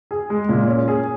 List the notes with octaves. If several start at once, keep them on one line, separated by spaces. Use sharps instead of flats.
G#4
G#3
A#2
C#4
G#4